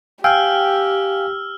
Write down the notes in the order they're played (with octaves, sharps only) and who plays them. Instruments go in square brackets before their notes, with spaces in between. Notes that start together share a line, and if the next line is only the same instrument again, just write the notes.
[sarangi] G4 [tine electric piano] F5 G5 G#5 [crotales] E6 F6